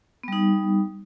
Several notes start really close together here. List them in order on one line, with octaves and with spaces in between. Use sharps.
B3 G3 D#4